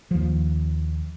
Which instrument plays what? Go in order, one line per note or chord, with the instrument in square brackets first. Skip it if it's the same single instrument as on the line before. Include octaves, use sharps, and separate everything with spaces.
[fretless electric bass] D#2 F3